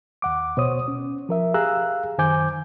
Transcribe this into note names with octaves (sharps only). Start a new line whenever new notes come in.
D#2 F#5 D6
B2 C5 C#5 D#6
C#4
F3 A#4 E5
G4 G#4 F5 A#5 E6 F#6
F#2 D#3 C5 G#5 D6 G6